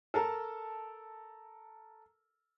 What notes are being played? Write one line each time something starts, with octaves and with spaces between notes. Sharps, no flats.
A4 A#4 A5